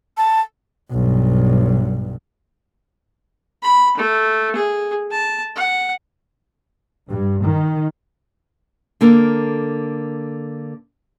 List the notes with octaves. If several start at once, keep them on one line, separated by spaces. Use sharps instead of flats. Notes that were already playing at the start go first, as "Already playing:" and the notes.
A5
B1 G2
B5
A3
G#4
A5
F#5
G2
D#3
D3 A#3 A4 A#4